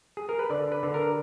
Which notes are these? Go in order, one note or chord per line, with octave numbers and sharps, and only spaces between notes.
G#4
A#4
B4
D3 D5
B4
D3
A#4